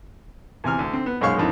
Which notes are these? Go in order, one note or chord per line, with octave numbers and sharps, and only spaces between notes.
E2 C3 G#5 F6
D2
D3 C4
B3
B1 F#2 G#3 C#5 F5 C#6
F2 A2 D3 D#3